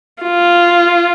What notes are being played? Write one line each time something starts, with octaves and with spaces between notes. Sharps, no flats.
F4